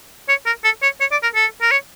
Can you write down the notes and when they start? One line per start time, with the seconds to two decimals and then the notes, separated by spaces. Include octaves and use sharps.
0.29 C#5
0.46 A#4
0.64 A4
0.83 C#5
1.01 C#5
1.12 D5
1.23 A#4
1.35 A4
1.62 A#4
1.71 C#5